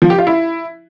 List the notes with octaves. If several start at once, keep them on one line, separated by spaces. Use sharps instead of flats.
F3
G4
F4
E4